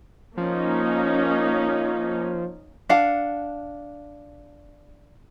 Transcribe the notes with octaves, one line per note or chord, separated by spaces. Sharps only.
F3 A#3 C#4 D#4
D4 F5 F#5